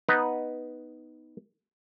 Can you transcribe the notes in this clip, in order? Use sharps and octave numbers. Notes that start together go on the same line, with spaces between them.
B3 D#4 B4